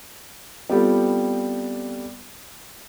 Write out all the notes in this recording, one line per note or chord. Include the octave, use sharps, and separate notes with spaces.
G3 B3 C4 F4 G4 A4